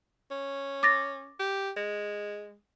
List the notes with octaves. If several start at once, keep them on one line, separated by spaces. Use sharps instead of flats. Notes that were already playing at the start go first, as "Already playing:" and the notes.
C#4
D6 A6 A#6
G4
G#3